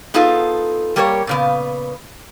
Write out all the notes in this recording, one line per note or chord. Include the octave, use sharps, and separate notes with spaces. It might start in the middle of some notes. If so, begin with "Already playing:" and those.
B3 D#4 F4 G#4 A4
G3 A#3 G4 A#4 C#5
A#2 C#3 B3